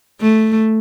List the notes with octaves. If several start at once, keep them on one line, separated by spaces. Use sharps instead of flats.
A3